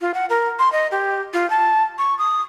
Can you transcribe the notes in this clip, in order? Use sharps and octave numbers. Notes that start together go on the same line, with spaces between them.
F4
F#5
A#4
C6
D#5
G4
F4
A5
C#6
D#6